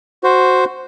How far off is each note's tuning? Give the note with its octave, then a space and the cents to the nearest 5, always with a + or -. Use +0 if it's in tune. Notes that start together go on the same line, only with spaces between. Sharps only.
F#4 +0 C5 +0